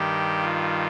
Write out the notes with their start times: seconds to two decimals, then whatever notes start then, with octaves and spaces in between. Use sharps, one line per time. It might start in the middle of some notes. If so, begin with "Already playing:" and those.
Already playing: G2 D#3 G4
0.42 F4